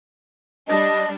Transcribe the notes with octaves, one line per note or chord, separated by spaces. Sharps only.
G3 D4 D#5